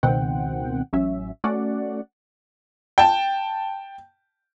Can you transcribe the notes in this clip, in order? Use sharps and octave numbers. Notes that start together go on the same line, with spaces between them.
C#2 B2 D#3 C4 F#5 G5
A1 F#3 C#4 E5
A3 C#4 F#4 D5 F#5
G5 A5